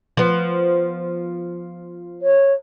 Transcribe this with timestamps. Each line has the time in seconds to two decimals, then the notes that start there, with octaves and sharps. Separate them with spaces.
0.17 F3 B3
2.22 C#5